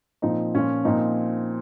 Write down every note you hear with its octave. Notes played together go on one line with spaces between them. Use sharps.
A#2 F3 C4 D#4
A#2 F3 C#4 F4
A#2 F3 C4 D#4